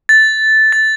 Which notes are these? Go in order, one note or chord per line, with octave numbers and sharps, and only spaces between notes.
A6
A6